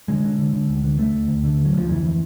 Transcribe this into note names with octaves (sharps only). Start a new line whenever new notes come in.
D3 G#3
D3
D3
D3
D2
D3
D3 A3
D2
D2
D3
D2
F#3
D2 F3
F2 E3